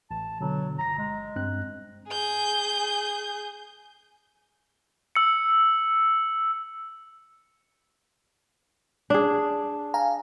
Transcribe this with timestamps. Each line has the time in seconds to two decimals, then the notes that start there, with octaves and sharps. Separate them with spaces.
0.11 A1 A5
0.41 B2 D3 F#3
0.79 G1 A#5 A#6
0.98 G#3
1.36 G2 C4 F#6
2.09 G#4 G6
5.15 E6 C#7
9.10 D4 G#4
9.94 F5 G#5 A#5